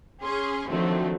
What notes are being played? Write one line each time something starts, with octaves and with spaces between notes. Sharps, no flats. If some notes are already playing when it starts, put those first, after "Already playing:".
C#4 G#4 C6
D3 D#3 F3 F#3 A3 C4